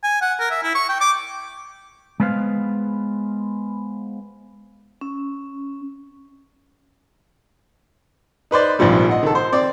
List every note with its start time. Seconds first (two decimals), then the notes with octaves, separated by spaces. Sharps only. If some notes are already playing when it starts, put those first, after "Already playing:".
0.04 G#5
0.22 F#5
0.40 A#4
0.51 E5
0.63 E4
0.75 C#6
0.89 G5
1.00 D6
2.20 G#3 B3 B4 C5 F5
5.01 C#4
8.51 D#4 B4 C5 D5
8.79 A#1 G#2 C3 F3 G3
9.09 D#5 F#5
9.23 D#3 A4
9.35 C5
9.53 C4 D5 D6